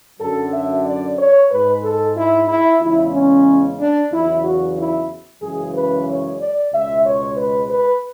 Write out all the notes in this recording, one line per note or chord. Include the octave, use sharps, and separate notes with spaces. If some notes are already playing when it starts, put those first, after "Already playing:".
F#2 D3 F#3 A4
E5
D5
C#5
G#2 G#3 B4
A4
E4
E4
E2 C#3 G#3 E4
C#4
D4
E2 C#3 F#3 E4
F#4
E4
F#2 C#3 E3 G#3 G#4
B4
C#5
D5
C#2 B2 G#3 E5
C#5
B4
B4